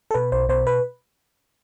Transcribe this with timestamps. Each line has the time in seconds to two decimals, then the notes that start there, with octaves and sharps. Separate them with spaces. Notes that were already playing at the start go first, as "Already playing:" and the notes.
0.11 A4
0.14 B2 B4
0.32 B1 C5
0.49 B2 C5
0.67 B4